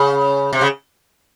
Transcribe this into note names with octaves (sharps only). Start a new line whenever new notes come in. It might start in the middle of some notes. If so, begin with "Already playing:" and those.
Already playing: C#3
C3
C#3